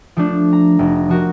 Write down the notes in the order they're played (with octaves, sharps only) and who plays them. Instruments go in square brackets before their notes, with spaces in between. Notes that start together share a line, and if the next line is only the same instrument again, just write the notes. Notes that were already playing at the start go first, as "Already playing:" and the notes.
[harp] F3 A3 D4
A#5
F1
F3 F#4 A#4